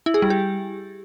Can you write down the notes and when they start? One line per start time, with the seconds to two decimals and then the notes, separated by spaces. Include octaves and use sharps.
0.06 E4
0.14 G#4
0.22 G3
0.30 G4